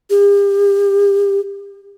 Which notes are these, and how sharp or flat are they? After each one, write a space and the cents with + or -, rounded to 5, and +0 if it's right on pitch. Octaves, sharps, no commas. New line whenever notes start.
G4 +35